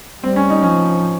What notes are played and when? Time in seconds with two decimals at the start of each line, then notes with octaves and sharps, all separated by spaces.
0.24 G3 C4
0.36 C#4
0.50 D#4
0.63 F3 C#4